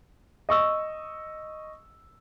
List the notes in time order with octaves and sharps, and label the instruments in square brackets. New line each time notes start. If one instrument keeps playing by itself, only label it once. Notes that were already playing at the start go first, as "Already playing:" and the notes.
[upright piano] D#5 C#6 E6